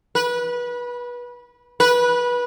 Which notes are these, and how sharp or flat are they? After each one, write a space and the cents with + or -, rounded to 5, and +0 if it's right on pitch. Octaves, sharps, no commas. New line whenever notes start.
B4 -25
B4 -20